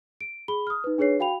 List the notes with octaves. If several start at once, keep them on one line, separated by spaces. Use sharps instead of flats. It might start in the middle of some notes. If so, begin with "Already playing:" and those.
D7
G#4 B5 G7
D#6 F6
D#4 B4
D4 G#4 B4 C#5 C7
F#4 F5 G5 B5 F7